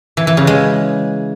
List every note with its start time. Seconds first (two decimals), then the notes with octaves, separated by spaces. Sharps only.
0.17 E3
0.27 E3
0.37 C#3
0.47 G#3